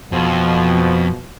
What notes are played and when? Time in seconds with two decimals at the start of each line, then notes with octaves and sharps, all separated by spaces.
0.12 F2 B2 F3